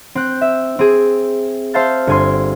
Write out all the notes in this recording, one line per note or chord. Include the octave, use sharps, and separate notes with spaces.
C4 F#6 G6
E5
C4 G#4
C5 E5 F5 A5 G6 A6
G1 G#5 C6